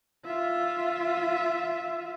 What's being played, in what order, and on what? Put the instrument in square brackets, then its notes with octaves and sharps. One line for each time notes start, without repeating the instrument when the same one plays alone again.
[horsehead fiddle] F4 E5